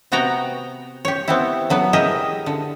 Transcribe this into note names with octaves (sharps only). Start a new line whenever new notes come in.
C3 B3 F#4 G5 A#5
G4 C#5
B3 C4 E4
D3 F#3 B3
E4 G4 G#4 A#4 D#5 E5
D3